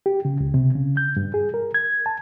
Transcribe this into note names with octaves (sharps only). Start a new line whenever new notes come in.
G4
C#3
C#2
C3
C#3
G6
G2
G#4
A#4
G#6
A5